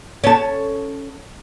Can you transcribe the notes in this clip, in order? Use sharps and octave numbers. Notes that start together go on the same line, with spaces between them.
C#4 A4